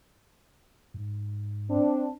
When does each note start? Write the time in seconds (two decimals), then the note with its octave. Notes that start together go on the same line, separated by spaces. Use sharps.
0.94 G#2
1.69 C4 D4